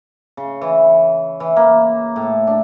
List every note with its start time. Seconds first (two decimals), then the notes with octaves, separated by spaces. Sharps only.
0.37 C#3
0.61 E3
1.40 E3
1.56 A#3
2.16 A2
2.47 D4